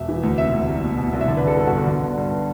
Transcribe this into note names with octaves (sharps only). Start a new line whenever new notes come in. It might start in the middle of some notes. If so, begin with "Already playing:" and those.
Already playing: E1 E5
E3
D2
C3 E5
D2
C2
B2
B2
C2
E5
D3 D5
B4
G1 A4
G2 A4
F#4
G1
D3
G1
G2